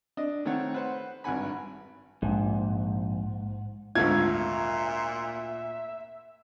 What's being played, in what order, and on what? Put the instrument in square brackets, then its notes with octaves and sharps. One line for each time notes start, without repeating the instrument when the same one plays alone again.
[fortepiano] D4 D#5
D#3 A3 C4 C#5 F#5
B4 C5 F#5
G#1 G2 D3 F#5 G#5 B5
[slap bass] A#1 [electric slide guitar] G#2
[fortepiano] G#1 D2 F4 [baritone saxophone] A#2 [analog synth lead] E5 [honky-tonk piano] G#6